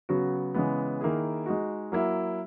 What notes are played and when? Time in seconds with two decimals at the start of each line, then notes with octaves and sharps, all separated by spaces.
0.09 C#3 F#3 B3 F#4
0.54 C#3 E3 G#3 B3
1.01 D#3 A#3 E4 G#4
1.46 G#3 D#4 F#4
1.92 F#3 A#3 E4